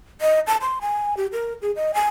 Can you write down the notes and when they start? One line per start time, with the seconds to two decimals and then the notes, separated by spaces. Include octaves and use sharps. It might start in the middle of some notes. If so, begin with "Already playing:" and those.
0.21 D#5
0.47 A5
0.61 C6
0.81 G#5
1.17 G4
1.33 A#4
1.62 G#4
1.76 D#5
1.94 G#5